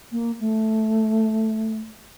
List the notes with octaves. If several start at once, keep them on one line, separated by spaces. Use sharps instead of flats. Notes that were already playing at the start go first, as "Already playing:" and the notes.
A#3
A3